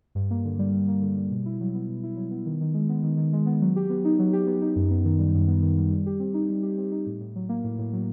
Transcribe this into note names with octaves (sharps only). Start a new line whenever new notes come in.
G2
A#3
D3
G3
G2
A#3
D3
G3
B2
E4
F#3
B3
B2
E4
F#3
B3
D#3
D#3
G#3
B3
D#3
D#3
G#3
B3
F#3
G4
B3
D#4
F#3
G4
B3
D#4
F#2
B3
D#3
G3
F#2
B3
D#3
G3
G3
G4
C4
D#4
G3
G4
C4
D#4
A2
A2
F#3
A#3
A2
A2
F#3